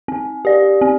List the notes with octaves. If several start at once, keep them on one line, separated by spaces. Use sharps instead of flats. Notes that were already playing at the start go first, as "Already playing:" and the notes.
C4
G4 D5
C4